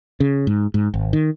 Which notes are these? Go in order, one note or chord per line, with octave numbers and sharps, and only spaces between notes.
C#3
G#2
G#2
G#1
D#3